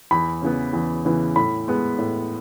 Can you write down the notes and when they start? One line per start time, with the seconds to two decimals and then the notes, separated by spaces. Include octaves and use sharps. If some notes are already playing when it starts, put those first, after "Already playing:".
0.11 E2 B5
0.42 C#3 E3 B3
0.73 E2
1.05 C#3 E3 B3
1.36 A2 B5
1.68 G#3 B3
1.98 A2